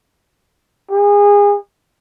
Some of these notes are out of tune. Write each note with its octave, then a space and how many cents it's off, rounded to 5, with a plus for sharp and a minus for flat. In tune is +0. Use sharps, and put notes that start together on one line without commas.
G#4 -30